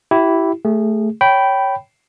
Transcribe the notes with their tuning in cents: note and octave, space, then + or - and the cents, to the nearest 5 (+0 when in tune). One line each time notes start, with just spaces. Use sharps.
E4 +0 G4 -30
A3 +0 G#4 -25
C#5 +0 G5 -15 B5 +0